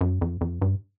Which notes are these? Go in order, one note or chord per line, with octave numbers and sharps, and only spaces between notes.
F#2
F2
F2
G2